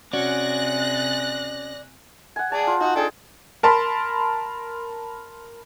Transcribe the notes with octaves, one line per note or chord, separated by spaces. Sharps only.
C3 C#4 F#4 G#4 D5 F#6 A#6
F#5 G#5
G#4 D5 A5
F4
D#4 F#4 F#5
D4 G#4 A4 G5
A#4 A5 B5 C6